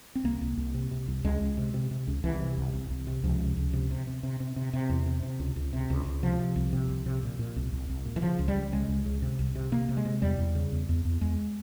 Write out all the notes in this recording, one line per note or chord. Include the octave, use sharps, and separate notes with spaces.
C4
C2 A#3
C2
C2
C3
C3
C2
C#2 G#3
C#2
C3
C3
C3
C#2
C2 E3
C3
C2
C2
C2
C3
C#2 F3
C3
C#2
C3
C3
C3
C3
C3
C3
C3
E2
C3
C3
C#2
C#2
C3
C#2
C#2
C3 F3
C3
C2
C3
C2
C3
A#2
A#2
C2
C2
C2
A#2
E3
C#3 F3
C#2
G3
C#2
C#3 G#3
C#2
C#3
C3
C2
C3
C3 A#3
C3
G#3
C3
E2 G3
E2
C#3
E2
E2
E2
E2 G#3